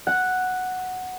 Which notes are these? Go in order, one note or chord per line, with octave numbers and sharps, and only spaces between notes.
F#5